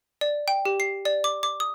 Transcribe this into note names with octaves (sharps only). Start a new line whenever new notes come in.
D5
G5
G4
C7
D5
D6
D6
D#6